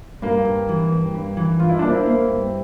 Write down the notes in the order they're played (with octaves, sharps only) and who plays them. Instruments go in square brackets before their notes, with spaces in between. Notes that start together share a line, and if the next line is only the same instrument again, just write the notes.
[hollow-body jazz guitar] G2 [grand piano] A#3
[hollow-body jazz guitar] G2
E3
G2
G2
E3
[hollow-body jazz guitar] G2 [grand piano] F4
[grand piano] E4
[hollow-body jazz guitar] A#3 [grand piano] D4
[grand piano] C4 E4
[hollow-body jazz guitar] A#3
G2